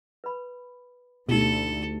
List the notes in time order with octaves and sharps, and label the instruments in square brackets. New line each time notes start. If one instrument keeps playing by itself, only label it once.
[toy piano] B4 B5
[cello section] D2 [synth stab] B2 [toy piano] D#4 E4 G4 [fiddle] A4